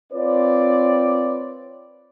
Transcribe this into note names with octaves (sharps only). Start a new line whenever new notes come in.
C4 F4 B4 C#5 D5